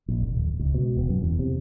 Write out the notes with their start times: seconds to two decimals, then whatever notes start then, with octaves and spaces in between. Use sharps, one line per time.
0.08 A#1
0.21 F1
0.34 D1
0.59 C#2
0.74 B2
0.97 E1
1.09 F#2
1.23 E2
1.39 C3